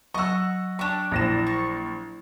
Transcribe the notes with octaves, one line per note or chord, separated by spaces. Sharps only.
F#3 D#5 F#5 C#6 E6
D4 G4 C#6
A#1 E4 D5 A#6 E7
C#6